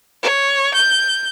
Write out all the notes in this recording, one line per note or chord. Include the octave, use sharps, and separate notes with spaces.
C#5
G6